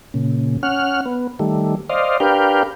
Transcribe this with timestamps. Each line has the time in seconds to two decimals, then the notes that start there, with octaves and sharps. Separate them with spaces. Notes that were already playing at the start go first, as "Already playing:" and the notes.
0.14 A#2 C#3
0.63 C#4 F#5 F6
1.06 B3
1.39 D#3 G3 A3
1.90 C5 D5 D#5 F5
2.20 D4 G4 A#4 B4 F5 G5